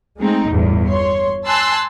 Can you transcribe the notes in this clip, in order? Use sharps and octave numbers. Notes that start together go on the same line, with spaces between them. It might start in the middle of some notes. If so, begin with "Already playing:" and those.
G#3 A3 C4 D#4
G1 E2 A2
C#5 C6
G#5 A5 C6 E6 F#6